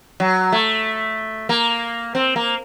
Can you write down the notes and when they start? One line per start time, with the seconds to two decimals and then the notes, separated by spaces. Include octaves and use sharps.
0.20 F#3
0.52 A3
1.49 A#3
2.15 C4
2.36 A#3